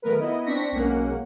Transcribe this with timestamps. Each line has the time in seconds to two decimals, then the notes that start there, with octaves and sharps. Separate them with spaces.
0.02 D#3 F#3 A3 B3 A#4 B4
0.19 B3 D#4 E4 D#5
0.46 C4 D4 C#6 A#6 B6
0.72 B1 G#3 A#3 C#4 F#5